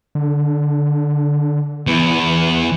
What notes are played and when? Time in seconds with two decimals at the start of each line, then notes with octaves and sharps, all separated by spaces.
0.15 D3
1.87 E2 E3